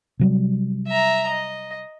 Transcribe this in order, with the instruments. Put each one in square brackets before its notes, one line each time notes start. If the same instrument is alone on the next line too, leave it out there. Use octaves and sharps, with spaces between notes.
[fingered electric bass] C3 F#3 G3
[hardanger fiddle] E5 A#5
D#5